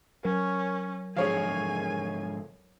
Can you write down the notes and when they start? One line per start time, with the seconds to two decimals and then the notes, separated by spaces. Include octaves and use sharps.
0.25 F#3 C#4 A#4
1.17 G#2 D3 F3 G#4 C#5 F5 G#5